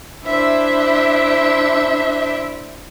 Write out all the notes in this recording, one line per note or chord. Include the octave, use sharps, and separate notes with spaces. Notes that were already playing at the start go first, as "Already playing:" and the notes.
D4 E4 C5 E5